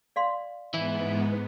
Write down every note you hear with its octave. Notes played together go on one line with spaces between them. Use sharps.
D5 F5 C6
G#2 E3 B3 E4